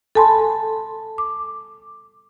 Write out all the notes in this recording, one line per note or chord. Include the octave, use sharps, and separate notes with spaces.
A4 G#5 A5 B5 C6
D6